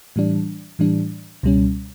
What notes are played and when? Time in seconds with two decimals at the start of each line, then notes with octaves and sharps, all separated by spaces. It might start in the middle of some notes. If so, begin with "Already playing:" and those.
0.16 A2 E3 G3 D4
0.79 A2 E3 G3 D4
1.43 C#2 B2 G3 C#4